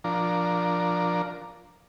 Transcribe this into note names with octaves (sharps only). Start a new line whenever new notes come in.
F3 D4 A#4